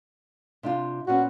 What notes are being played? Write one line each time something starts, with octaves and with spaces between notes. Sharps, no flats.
C3 D4 F4
A#2 B3 C#4 F#4